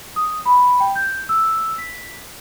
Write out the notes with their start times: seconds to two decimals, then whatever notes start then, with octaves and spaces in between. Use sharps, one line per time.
0.16 D#6
0.46 B5
0.80 G5
0.95 G6
1.29 E6
1.78 B6